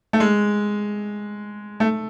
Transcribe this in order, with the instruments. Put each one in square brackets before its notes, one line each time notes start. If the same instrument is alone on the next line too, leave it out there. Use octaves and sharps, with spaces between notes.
[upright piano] A3
G#3
A3